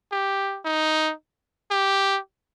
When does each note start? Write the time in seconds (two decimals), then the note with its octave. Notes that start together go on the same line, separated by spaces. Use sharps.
0.12 G4
0.65 D#4
1.71 G4